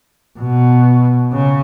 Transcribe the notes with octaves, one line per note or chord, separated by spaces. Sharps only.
B2
C#3